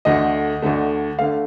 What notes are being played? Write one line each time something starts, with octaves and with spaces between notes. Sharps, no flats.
D2 D3 A3 D#5
D2 D3 A3
D3 A3 F5